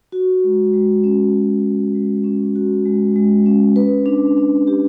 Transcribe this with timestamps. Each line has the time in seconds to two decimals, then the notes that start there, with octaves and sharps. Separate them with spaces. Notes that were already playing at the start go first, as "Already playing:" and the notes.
0.12 F#4
0.44 G#3
0.74 G#3
1.04 C#4
1.34 F#4
1.64 G#3
1.95 G#3
2.24 C#4
2.56 F#4
2.85 G#3
3.16 G#3
3.46 C#4
3.76 B4
4.06 D4
4.37 D4
4.67 G4